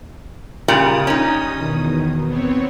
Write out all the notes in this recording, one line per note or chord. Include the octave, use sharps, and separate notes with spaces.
A#2 C#3 G3 D#6
C#4 D#4
E2 B2 D#3
B3 C4 C#5